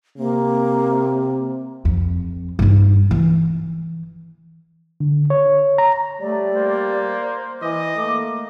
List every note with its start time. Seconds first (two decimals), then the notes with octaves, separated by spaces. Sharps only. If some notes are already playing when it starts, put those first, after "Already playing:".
0.18 C3 A#3
1.85 F2
2.59 G2 D#4
3.11 E3
5.00 D3
5.30 C#5
5.78 A#5
6.20 G3 A3 D5
6.56 A#3 C5
7.62 E3 D#5 D6
7.96 A3 A#3